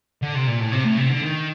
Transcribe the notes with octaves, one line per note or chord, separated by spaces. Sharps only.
D3
C3
A#2
A2
C3
A2
C3
D3
D#3